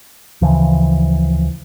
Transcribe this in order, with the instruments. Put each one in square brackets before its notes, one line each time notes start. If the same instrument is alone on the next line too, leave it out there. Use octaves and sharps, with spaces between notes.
[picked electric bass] D2 C#3 E3 F3